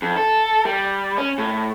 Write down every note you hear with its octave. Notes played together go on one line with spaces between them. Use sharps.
F2
A4
G3
C#4
A2